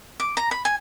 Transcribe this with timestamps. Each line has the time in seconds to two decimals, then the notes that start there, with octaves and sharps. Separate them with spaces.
0.20 D6
0.37 A#5
0.51 B5
0.65 G#5